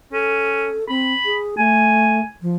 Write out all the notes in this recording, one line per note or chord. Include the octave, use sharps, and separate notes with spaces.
C#4 A4
C4 B5
G#4
A3 G#5
F3